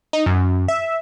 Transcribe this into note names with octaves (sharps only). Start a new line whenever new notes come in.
D#4
F#2
E5